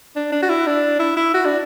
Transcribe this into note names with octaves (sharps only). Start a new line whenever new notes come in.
D4
D4
F#4
E4
D4
E4
E4
F#4
D4